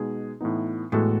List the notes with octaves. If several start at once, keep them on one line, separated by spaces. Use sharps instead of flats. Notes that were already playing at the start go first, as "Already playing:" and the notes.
Already playing: B2 G#3 D#4 G#4
A2 E3 B3 D#4
A2 E3 G#3 B3 F#4 A4